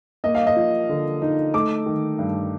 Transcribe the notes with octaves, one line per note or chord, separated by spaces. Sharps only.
A#3 D#5
F5
D#5
F3
D3
D#4
A3 D6
D#3
G2